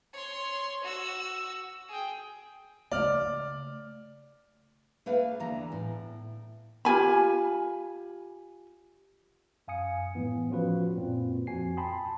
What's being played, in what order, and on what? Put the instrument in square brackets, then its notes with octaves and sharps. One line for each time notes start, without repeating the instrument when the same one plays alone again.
[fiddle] C#5 C6
F#4 E6
G#4 G5
[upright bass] C#3 A3 [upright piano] D5 F6
[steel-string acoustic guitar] A3 A#3 B4 F5
E2 D3 E3 A#5
A2
[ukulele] F4 G4 G#5 B5
[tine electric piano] F#2 F5 G#5 D#6 C#7
A2 E3 B3
F3 C#4 F4 F#4 B4
F#2 A#2 C4
F2 F#4 G#5 C7
G5 A5 B5 C6 D#6